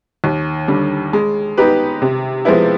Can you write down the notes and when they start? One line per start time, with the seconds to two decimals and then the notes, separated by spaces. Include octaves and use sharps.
0.24 D#2
0.68 D3 G3
1.13 G#3
1.57 B3 D#4 G4 B4
2.02 C3
2.45 F3 G#3 B3 E4